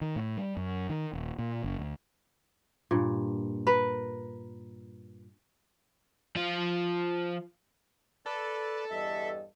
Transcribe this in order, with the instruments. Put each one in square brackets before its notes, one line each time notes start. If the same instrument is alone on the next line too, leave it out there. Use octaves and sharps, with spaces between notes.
[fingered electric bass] D#3
A2
G3
F#2
D#3
D#1
A#2
F#1
D2
[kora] G2 A#2
[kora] A#4 [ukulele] B4
[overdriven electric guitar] F3 F4
[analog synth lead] A4 [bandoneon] B4 D5
[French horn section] E2 G2 D#5 [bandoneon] E5